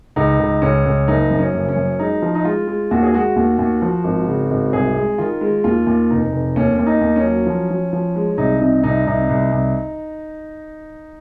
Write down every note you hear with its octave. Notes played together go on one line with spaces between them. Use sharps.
C#2 D#4
C#2
C#2 C#4
C#2
F#1 D#4
F#2
C#4
F#1
C#4
F#2
G#3 D#4
F3
D#4
G#3 F4
G#3
D#2 F#4
G#4
G#3 F#4
D#2
D#2
F3
G#1
C#3
G#1
C2 G#4
G#3
D#3 F4
G#3
D#2 F4
D#2
F1 D#4
F1
D#2 C#4
D#2 C#4
D#4
D#2
C#4
F#3
F3
F3
F3
G#3
C2 D#4
C3 D#4
C2 D#4
C2 D#4
C2
C2